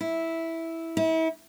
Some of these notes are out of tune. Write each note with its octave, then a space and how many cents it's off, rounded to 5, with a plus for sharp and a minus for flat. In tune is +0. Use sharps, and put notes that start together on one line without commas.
E4 -5
E4 -35